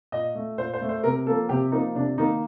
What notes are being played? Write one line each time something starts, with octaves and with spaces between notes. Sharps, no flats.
A#2 D#5
A3
A#2 C5
C5
A3
C5
C3 A#4
F3 A#3 A4
C3 G4
F3 A#3 D#4
C3 D4
D#3 A#3 D#4